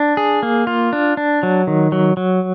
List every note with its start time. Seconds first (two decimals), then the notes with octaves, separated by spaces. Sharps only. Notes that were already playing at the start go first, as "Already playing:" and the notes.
Already playing: D4
0.17 G#4
0.43 A#3
0.67 F4
0.93 D4
1.17 D4
1.43 F#3
1.67 D#3
1.92 F#3
2.17 F#3